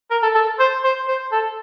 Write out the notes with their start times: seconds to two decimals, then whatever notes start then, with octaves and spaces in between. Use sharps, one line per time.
0.11 A#4
0.23 A4
0.35 A4
0.59 C5
0.84 C5
1.08 C5
1.32 A4